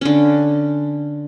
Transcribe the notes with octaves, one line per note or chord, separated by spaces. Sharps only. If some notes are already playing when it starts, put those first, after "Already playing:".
D3 C#4